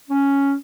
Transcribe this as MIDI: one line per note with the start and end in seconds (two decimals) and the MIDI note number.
0.10 0.53 61